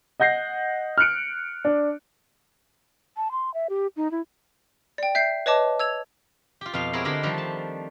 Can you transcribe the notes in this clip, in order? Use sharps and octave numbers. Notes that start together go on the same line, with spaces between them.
D#5 F#5 G6 A#6 C7
F6 F#6 C#7 D7
D4
A5
C6
E5
G4
D#4
E4
D5 G5
E5 G6 C7
B4 C#5 D#5 A5 D6
E6 G#6 F7
F4 G4
F2 B2 F4 F5
G#3 B3 C4 E4 A#4 C#5
D3 D4 G4 A#4 C5 B5
D#3 F3 G3 A3 C4 D4
A5